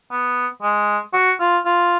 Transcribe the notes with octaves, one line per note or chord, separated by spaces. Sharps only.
B3
G#3
F#4
F4
F4